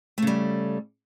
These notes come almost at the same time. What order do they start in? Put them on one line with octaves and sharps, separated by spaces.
A3 C#3 G3